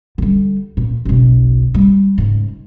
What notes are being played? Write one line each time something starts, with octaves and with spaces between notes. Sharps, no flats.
D3 G3
A#2
F#1 B1
G3
G#2 C#3